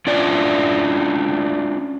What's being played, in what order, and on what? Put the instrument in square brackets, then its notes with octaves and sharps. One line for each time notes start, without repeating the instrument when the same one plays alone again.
[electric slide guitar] C#4 D4 F4 D5